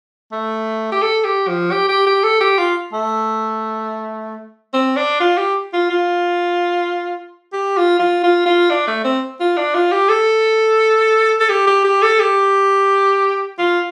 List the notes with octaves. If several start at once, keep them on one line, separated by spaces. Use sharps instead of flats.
A3
G4
A4
G4
F3
G4
G4
G4
A4
G4
F4
A3
C4
D4
F4
G4
F4
F4
G4
F4
F4
F4
F4
D4
A3
C4
F4
D4
F4
G4
A4
A4
G4
G4
G4
A4
G4
F4